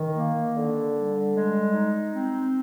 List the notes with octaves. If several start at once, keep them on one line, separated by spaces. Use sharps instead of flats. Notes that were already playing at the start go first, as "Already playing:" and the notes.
Already playing: D#3
A#3
D3
G3
G#3
D#4
C4